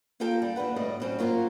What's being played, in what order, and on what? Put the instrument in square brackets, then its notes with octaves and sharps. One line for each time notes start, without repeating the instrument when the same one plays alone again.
[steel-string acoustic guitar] A#3 F4 G4 A4 G5 A#5
G3
D#2 D4 B4 F#5
D2 A2 G3 D#5
F#3 C4 C#4
F#3 A#3 F4 F#4 A#4